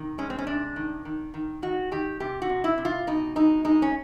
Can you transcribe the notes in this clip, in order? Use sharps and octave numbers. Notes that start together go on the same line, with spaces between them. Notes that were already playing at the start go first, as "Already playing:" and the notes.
Already playing: C3 D#3
G#3 C#4
C4
C#4
C3 D4
D#3
D#3
D#3
D#3 F#4
D#3 G4
C3 G4
F#4
C3
E4
C3
F4
B2 D#4
G#3 D#4
G#3 D#4
C#4